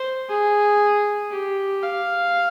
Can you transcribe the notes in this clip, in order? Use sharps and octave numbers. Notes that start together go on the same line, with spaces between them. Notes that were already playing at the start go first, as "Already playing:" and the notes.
Already playing: C5
G#4
G4
F5